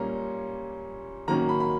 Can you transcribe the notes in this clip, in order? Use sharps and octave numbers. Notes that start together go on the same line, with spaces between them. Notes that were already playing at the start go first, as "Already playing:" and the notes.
Already playing: A#2 G3 A#3 C#4 A#5
D#3 F#3 A#3 C#4 A#5
B5
B5